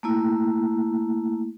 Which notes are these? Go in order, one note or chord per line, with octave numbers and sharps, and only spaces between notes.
A3 A#3 E4